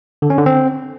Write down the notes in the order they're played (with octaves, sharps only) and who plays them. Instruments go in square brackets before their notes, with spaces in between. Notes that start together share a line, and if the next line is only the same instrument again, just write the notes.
[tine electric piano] D3
C#4
D3
C4